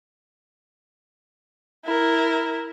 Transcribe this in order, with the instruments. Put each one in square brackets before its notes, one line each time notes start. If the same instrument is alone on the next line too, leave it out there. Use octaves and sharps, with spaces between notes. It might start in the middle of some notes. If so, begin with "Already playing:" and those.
[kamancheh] E4 A#4